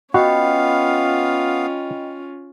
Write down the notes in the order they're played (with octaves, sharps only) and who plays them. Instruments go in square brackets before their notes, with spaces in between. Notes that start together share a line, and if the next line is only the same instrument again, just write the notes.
[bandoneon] B3 F5 [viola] C#4 F4 [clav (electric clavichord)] F#4 [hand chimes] D#5 G5 B5